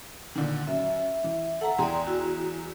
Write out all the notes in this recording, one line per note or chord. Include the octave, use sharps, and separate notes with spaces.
A#2 D3 D#3
F#2 E5
E3
A4 E5 F#5 A#5
E2 G#4 D5 G5 A#5 C6
E4 F#4